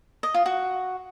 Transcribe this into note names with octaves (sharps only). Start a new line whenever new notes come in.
D#5
F4
F#4